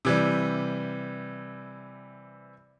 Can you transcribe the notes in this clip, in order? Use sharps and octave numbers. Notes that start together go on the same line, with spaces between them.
C3 E3 G3